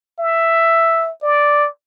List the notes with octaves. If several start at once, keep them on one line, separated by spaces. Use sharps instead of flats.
E5
D5